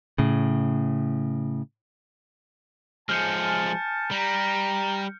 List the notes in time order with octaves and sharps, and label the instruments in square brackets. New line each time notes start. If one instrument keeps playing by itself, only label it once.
[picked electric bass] A2 C#3
[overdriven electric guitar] F3 G#3 [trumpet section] G#5 A5 [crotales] F6 G6 C#7
[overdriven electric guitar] G3 [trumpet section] A#5